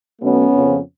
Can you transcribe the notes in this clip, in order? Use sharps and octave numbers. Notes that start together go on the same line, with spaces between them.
B2 F#3 A3 B3 C#4
F2 C#3 F3